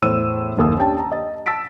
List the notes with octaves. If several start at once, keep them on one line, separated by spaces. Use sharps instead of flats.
E2 A2 C5 E6 D#7
F#1 D#2 A#3 D#6 E6
C#4 D4 G4 G5 A5
A5 A#5
D#5 A6
A5 E6 A6 B6 D7